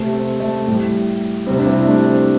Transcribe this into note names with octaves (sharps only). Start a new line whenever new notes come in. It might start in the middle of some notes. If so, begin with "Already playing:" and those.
Already playing: C3 A3
C4
A3
A2 G3
C3 G3 C4
D4
C4 E4
A3 D4
C4